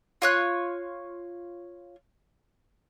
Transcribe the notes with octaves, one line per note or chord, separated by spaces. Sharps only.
F4 C#5 F#6